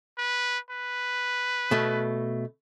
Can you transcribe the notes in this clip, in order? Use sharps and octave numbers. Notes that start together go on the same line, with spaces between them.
B4
B4
B2 A3